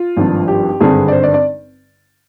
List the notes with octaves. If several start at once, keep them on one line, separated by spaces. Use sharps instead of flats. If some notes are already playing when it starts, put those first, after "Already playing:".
Already playing: F4
G#1 G2 F3
G4
G#1 G2 D3 G3 C4 G#4
D5
C5
D5
D5